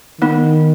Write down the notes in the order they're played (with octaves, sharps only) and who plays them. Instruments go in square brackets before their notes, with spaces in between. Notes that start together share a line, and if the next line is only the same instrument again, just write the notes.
[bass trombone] D#3 [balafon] B3 D#4